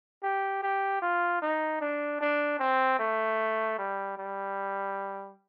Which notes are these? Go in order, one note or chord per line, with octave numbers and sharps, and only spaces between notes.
G4
G4
F4
D#4
D4
D4
C4
A3
G3
G3